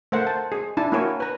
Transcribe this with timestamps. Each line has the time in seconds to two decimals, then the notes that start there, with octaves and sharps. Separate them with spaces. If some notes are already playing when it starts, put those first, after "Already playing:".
0.12 A3 A#4 C5 F#5
0.27 A5
0.52 G#4
0.77 D4 E4 G#5 A5
0.92 A#3 E4 F#4 A#4 C#5 G#5
1.20 B4 A#5